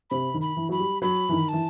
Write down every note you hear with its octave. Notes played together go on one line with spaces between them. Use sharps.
C3 B5
D#3
B5
E3
F#3 B5
G3
F#3 B5
E3
D#3
E3 A5